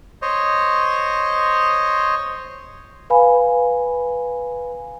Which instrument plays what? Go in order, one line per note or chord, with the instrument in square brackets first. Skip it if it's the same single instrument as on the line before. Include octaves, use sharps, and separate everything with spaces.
[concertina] C5 C#5 D#5
[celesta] B4 F5 G#5 B5